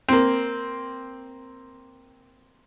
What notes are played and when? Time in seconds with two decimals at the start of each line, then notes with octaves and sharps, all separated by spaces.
0.09 A#3 C4